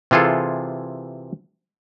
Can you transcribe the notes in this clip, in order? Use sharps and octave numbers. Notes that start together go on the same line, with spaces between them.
C3 E3 F4 G#4 A4